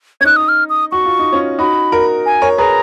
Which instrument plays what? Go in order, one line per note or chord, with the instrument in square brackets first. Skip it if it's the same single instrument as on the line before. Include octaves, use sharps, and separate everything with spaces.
[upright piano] C#4 [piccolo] G#6
[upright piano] D#4 [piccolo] F#6
[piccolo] D#6
F6
D#6
[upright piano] F#4 [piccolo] C#6
[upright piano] F4
D#4
C#4 F4
[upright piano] D#4 F#4 [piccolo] B5
[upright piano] F#4 A#4
[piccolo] G#5
[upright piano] A#4 C#5
[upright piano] G#4 B4 [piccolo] A#5